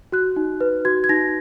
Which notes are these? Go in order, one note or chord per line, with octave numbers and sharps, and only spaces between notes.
F#4 F#6
D#4
B4
F#4 G#6
G#6
D#4 A#6